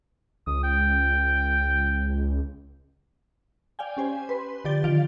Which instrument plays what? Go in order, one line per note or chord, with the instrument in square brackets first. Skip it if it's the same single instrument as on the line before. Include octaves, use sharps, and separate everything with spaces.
[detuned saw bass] C#2 [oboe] D#6
[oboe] G5
[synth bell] D5 F5 G5 G#5
C#4 G4 C5 G#5
B4 C6
D3 F3 G4 D5 A6 G7
D3 D#3 F4 F5 D7